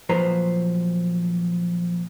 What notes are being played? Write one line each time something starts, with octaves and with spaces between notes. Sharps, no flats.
A#2 F3 F#3 B4 C5 A#5